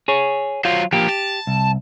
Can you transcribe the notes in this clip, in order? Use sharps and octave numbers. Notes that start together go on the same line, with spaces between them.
G#4 C#5
F#3 F4 C5
F3 A#3 G4
A5
C2